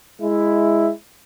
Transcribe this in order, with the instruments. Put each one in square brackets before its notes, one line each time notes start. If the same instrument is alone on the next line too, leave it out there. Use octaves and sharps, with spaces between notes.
[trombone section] G#3 E4